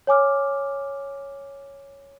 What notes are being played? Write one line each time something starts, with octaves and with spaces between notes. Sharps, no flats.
C#5 G#5 D6 F6